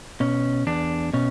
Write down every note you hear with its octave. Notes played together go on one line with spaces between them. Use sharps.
B2 C#4
E2 D4
B2 C#4